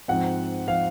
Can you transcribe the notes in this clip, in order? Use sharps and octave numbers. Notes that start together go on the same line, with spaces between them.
G#2 F3 C4 F#5
F3 C4 F5